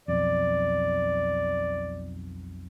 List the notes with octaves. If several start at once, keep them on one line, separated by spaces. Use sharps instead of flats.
B1 F2 D5